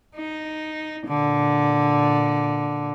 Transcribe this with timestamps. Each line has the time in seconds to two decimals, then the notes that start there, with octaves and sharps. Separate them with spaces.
0.16 D#4
1.07 A#2 D3